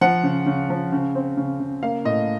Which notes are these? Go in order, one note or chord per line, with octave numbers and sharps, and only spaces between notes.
F3 F#5
C#3
C#3
F3
C#3
C4
C#3
C#3
A#3 F5
A2 D#5